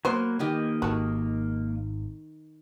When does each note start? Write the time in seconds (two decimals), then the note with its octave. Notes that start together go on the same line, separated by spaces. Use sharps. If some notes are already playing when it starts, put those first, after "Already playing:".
0.05 F#3 A#3 B3 B4 C5 C#6
0.39 D#3 A#3 G4 D#5 G#5
0.82 G#1 D#3 F#4 A4